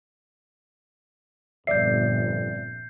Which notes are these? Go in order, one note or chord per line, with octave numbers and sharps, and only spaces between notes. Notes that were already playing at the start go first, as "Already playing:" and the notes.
G1 F2 A#2 D5 E5 G6 C7